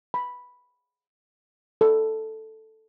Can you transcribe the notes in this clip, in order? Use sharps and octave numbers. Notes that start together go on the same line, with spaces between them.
B5
A4